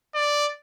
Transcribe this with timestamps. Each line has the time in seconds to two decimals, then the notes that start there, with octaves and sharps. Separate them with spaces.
0.15 D5